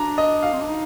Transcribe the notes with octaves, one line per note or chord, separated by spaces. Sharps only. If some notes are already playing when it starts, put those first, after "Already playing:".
Already playing: D4 A#5
D#5
F5
C4
D4
D#4